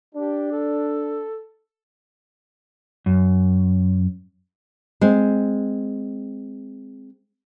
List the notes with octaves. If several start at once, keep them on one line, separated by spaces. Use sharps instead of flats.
D4 G4
A4
F#2
G#3 C4